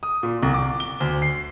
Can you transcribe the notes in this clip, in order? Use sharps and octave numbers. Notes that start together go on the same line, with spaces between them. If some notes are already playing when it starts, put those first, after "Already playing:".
D#6
A#2
C2
D6
G7
D2
C7